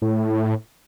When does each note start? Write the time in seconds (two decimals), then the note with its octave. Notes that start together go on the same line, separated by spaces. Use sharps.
0.02 A2